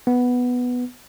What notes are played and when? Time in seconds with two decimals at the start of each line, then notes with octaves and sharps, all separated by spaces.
0.07 B3